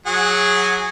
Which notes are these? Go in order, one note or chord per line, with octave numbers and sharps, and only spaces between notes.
F#3 G#4 F#5